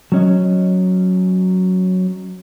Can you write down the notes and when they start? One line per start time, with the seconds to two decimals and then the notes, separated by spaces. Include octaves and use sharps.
0.12 F#3 C#4 D#5